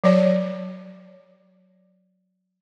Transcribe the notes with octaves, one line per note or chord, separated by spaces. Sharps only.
F#3 C#5 D5